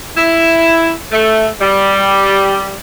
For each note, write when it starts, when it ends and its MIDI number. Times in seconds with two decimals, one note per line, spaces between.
0.17 0.93 64
1.12 1.47 57
1.61 2.76 55